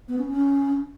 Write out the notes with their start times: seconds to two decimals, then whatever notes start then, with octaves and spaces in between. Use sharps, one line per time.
0.08 B3
0.18 C#4
0.28 C#4